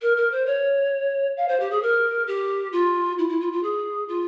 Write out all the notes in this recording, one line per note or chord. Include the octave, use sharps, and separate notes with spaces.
A#4
A#4
C5
C#5
F5
C5
G4
G#4
A#4
G4
F4
E4
E4
F4
F4
G#4
F4